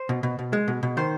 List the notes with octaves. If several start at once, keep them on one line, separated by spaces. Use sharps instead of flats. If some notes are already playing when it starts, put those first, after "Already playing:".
Already playing: C5
B2
B2
B2
G#3
B2
B2
D#3 C5